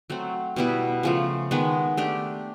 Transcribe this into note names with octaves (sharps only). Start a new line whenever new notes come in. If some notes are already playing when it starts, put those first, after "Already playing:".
F#3 A3 C4
B2 G3 B3 E4
C#3 F3 A3
D#3 G#3 B3
A3 D4 G4